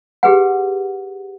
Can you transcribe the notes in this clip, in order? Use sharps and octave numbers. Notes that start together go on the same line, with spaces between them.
G4 G#4 B4 F#5